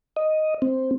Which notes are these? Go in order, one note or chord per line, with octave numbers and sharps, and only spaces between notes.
D#5
C4